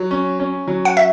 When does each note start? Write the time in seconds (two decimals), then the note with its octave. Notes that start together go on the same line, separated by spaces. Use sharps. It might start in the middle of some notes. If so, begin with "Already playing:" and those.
Already playing: F#3
0.11 C#4
0.40 C#4
0.67 F#3
0.85 F#5
0.97 E5